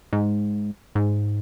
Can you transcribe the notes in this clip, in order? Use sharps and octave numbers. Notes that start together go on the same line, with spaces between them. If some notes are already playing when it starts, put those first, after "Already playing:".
G#2
G#2